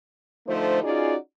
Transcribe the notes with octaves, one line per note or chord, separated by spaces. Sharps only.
D3 F3 A3 D#4 C5
C#4 D#4 F4 F#4 G#4 D5